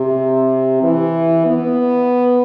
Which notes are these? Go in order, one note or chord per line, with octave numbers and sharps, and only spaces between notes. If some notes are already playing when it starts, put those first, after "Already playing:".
Already playing: C3
E3
B3